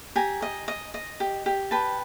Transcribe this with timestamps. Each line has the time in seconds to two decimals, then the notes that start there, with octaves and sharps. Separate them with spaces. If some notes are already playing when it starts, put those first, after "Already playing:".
0.16 G4 G#5 A#5
0.42 D#5
0.68 D#5
0.94 D#5
1.20 G4
1.46 G4
1.71 B4 G5 A5